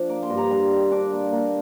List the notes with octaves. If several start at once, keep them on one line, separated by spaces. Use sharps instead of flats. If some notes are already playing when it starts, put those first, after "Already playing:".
Already playing: F3 D4 F4
A#3 D6
C6
G2
A#5
G3 C6
D#3
D4 D6
A#3
A#3